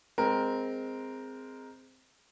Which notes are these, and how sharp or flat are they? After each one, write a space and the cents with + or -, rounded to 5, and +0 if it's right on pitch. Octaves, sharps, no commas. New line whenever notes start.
G#3 +0 C4 -10 A#4 +5